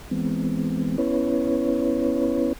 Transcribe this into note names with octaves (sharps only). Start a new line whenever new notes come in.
E3 G#3 B3 C4
B3 C#4 E4 B4 C#5